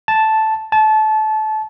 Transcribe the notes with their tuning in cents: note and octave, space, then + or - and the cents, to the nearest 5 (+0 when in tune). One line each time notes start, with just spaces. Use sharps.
A5 -5
A5 -25